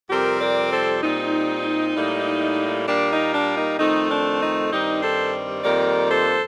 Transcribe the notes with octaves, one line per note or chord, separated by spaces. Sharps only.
F2 C3 G3 C4 G4 A#4
A#4 D5
A4 C5
A#2 G3 C4 D#4
A2 G3 A#3
A#2 G3 A#3 D4
D#4
D4
D#4
F2 D#3 A3 C4 D#4
D4
D#4
G2 D#3 G3 C4 D#4
A4 C5
F2 D#3 G3 A#3 A#4 D5
A4 C5